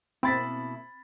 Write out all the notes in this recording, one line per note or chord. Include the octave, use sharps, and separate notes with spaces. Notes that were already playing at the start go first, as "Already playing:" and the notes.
B2 A#3 C4 E4 B5 A6 B6